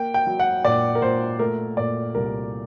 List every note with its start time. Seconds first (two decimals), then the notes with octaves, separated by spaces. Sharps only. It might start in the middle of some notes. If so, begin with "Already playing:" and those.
Already playing: A#3 G5
0.14 G5
0.27 F#3
0.39 F#5
0.64 A#2 D5
0.95 A#4
1.02 A#2 C5
1.39 A3 A#4
1.77 A#2 D5
2.15 C2 A#4